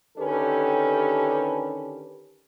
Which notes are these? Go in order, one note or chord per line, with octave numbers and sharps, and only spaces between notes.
D3 D#3 C#4 G4 A4 B4